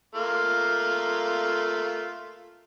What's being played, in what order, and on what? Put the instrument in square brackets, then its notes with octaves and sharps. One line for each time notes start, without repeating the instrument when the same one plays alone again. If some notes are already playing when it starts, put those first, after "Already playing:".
[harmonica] A3 A#3 F4